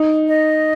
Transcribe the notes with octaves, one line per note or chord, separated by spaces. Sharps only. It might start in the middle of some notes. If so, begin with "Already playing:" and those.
Already playing: D#4
D#5